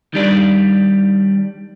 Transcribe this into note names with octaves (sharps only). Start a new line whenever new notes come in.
D#3 G3 D4